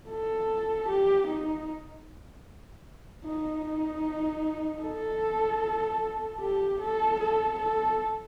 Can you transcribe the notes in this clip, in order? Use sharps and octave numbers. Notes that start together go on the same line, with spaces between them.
A4
G4
D#4
D#4
D#4
A4
G4
A4
A4
A4